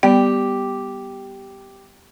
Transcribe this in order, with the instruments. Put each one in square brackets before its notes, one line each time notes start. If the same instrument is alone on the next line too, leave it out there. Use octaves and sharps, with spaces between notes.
[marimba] G3 B3 D5 [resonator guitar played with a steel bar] G4